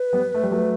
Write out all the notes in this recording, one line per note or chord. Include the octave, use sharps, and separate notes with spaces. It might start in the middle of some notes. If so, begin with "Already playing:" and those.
Already playing: B4
G3 B3
A3
G3
F#3 A3